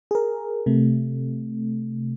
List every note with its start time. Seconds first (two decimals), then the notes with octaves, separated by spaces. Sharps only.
0.11 G#4 A#4
0.66 C3 A3